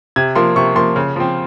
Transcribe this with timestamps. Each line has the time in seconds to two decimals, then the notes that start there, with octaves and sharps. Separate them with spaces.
0.16 C3 G#6
0.35 F3 A#3 C6
0.56 C3 C#6
0.75 F3 A#3 C6
0.96 C#3
1.16 F3 C4